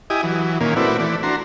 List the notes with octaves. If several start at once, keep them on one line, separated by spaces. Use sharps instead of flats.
E4 G4 D#5 G#5 D#6
E3 F#3
A#2 D#3 A#3 C#4
A3 C4 E4 F#4 B4 D5
E3 A3 D5
D4 F#4 A#5 C6